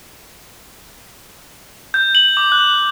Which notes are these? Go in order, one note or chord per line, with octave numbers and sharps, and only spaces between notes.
G6
F#7
D6
F#6